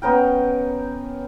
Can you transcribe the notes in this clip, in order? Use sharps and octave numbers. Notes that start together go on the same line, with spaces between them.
B3 C#4 A#4 G5